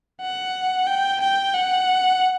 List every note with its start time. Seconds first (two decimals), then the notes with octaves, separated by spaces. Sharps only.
0.21 F#5
0.87 G5
1.21 G5
1.54 F#5